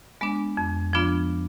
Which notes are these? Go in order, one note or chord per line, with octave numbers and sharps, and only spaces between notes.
G#3 B3 D4
F2
F3 B3 D4 F4